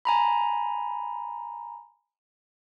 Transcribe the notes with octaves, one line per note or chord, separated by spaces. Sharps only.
G#5 A#5 B5